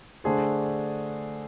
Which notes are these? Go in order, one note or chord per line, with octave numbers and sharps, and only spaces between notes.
D3 A3 D4 G#4 C5